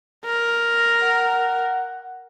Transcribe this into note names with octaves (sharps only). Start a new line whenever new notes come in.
A#4
F#5